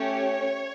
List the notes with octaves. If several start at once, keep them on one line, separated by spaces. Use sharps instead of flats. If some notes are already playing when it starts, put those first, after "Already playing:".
Already playing: A3 C#4 G4 C#5